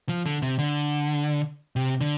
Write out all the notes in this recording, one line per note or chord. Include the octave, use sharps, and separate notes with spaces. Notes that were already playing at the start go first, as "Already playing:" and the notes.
F3
D3
C3
D3
C3
D3